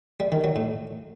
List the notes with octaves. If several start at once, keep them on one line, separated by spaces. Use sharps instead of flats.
G3
D#3
F#3
A2